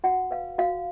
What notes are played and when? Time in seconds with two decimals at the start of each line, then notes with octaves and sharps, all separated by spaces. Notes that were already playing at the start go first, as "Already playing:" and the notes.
0.04 F#4 F#5
0.31 B4 F5
0.58 F#4 F5